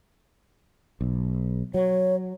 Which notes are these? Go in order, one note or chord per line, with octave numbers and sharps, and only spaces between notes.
B1
F#3 C#5